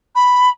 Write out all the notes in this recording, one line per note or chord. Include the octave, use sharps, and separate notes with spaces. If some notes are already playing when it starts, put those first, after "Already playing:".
B5